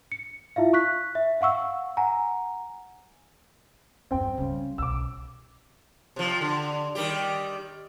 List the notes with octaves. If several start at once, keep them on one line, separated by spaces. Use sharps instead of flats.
C#7
E4 F4 E5 F5
C#6 F#6 B6
E5
F5 F#5 C#6 E6
F#5 G#5 A#5
E2 G2 C4 G5
C#3 G3 A3
B1 B2 D6 E6
C3 F3
D3
D#3 G3 G4